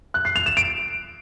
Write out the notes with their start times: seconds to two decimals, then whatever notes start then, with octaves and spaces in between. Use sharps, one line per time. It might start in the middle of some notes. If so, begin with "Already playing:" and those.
0.14 F#6
0.25 C7
0.36 F7
0.46 E7
0.57 D7